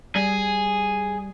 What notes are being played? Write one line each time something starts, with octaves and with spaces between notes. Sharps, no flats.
G3 G#4